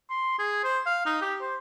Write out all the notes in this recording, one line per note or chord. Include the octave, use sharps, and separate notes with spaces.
C6
G#4
C5
F5
D#4
G4
C5